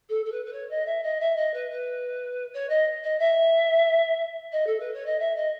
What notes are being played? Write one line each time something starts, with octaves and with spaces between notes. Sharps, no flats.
A4
A4
B4
B4
C#5
D#5
E5
D#5
E5
D#5
B4
B4
C#5
D#5
D#5
E5
D#5
A4
B4
C#5
D#5
E5
D#5